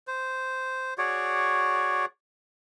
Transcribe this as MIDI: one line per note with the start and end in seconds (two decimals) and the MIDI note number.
0.08 0.94 72
0.98 2.05 66
0.98 2.05 68
0.98 2.05 73
0.98 2.05 74